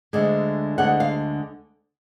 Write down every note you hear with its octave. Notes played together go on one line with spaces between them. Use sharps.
D2 D3 G#3
D2 D3 G#3 F#5
F5